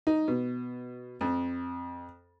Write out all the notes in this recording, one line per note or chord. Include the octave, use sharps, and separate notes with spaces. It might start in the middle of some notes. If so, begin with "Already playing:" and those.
D#4
B2
F2